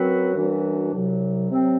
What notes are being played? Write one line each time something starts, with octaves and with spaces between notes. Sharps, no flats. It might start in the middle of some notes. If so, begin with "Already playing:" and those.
Already playing: F#2 F#3 C4 F#4 B4
F#2 E3 G3 D4 F#4
C2 C3 F#3
C3 F#3 C4